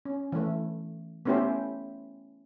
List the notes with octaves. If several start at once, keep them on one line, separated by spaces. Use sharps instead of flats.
C#4
E3 A3
A3 B3 C#4 E4 G4 C5